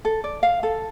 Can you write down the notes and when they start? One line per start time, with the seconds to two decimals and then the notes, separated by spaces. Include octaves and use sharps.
0.05 A4
0.24 D5
0.43 F5
0.63 A4